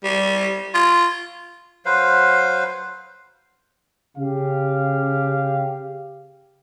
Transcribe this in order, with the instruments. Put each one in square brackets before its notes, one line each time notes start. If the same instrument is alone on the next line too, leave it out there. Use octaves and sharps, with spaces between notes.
[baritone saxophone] G3
F4
[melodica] F#3 B4 C5 F5
[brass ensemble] C#3 G4 F5